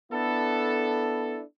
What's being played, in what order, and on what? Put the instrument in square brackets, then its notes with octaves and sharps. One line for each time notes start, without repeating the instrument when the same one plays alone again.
[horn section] B3 D4 E4 A4